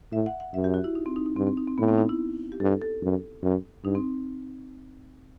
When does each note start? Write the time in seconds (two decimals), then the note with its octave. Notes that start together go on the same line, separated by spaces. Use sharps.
0.12 A2 E5
0.26 F#5
0.40 F#5
0.54 F#2 E5
0.64 G4
0.74 F#4
0.84 E4
0.95 D#4
1.06 C4
1.16 D#4
1.26 D#4
1.36 G2 C4
1.47 C4
1.57 D#4
1.68 C4
1.78 A2 B3
1.88 C4
1.98 D#4
2.09 E4
2.52 G4
2.60 G2 A4
2.82 A4
3.02 F#2
3.43 F#2
3.84 G2 D#4
3.95 C4